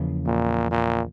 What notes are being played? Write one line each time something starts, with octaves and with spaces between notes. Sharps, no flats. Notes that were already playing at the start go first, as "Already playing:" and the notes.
Already playing: E2 C#3 F3 A#3
A#2
A#2